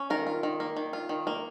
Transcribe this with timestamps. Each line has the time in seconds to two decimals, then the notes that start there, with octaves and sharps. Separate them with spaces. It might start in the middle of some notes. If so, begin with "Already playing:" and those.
Already playing: C#4
0.10 D#3 A#4
0.27 F4
0.43 D#3
0.60 A#3
0.77 D#3
0.93 F4
1.09 D#3
1.27 A#3